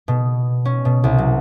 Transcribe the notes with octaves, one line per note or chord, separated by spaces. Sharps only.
B2
C#4
B2
C2
F#3